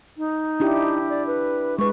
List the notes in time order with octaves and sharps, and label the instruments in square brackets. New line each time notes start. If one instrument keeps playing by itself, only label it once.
[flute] D#4
[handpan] D4 E4 G4
[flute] D5
B4
[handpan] G#3 B4 [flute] C#6